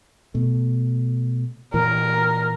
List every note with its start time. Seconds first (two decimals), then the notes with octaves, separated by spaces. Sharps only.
0.34 B2 A3
1.74 A#2 E3 A#4